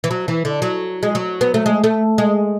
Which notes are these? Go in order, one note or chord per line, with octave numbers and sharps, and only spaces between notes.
E3
F#3
E3
D3
F#3
G#3
F#3
B3
A3
G#3
A3
G#3